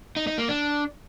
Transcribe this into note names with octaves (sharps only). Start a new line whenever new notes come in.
D#4
D#4
A#3
D4